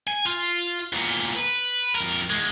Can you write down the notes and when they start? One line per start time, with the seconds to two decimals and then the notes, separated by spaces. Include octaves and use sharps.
0.07 G#5
0.26 F4
0.93 E2 A#2
1.35 B4
1.95 F2 A#4
2.30 E2 G#3